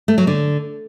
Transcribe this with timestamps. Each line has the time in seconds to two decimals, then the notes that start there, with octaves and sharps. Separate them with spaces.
0.08 A3
0.18 F#3
0.27 D3